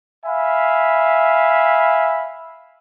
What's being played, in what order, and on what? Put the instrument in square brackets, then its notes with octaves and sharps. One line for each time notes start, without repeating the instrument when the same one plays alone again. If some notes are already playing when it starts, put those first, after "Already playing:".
[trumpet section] E5 F5 G#5 B5